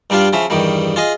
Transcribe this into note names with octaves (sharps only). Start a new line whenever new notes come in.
G2 G3 D4 F4 F5
C#3 F3 C#4 E5
E2 G2 D#3 G3
F4 G#4 D#5